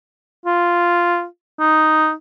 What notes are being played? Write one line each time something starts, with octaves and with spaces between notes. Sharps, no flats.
F4
D#4